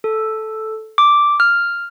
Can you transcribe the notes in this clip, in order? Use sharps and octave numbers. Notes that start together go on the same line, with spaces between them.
A4
D6
F6